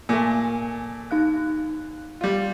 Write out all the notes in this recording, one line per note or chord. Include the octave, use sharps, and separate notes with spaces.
A#2 A3 G#5
D#4 F5 F#6
G3 F4